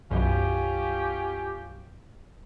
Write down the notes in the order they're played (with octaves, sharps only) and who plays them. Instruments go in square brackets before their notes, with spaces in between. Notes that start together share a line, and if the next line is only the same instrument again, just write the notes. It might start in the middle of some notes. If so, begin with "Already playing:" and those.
[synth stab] B1 F#2 [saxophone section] C#4 F4 G4